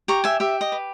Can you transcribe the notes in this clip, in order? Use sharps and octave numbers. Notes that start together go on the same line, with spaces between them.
G4 A#5 C#6
E5 G#5
G4 E5
D#5
B4